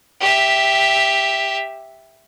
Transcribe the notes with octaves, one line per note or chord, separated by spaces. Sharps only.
G4 E5